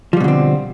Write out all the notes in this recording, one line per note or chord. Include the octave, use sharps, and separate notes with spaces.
B2 D3 F3 G3 C4